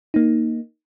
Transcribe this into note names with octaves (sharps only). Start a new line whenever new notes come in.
A#3 D#4